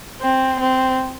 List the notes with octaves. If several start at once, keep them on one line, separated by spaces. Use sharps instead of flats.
C4
C4